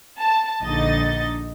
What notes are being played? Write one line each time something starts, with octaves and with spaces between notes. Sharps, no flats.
A5
A#1 D3 D#4 D#5 A6